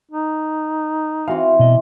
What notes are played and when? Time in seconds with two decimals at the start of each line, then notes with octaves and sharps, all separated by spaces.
0.11 D#4
1.28 E3 C4 F#4 F5
1.59 B2 D#5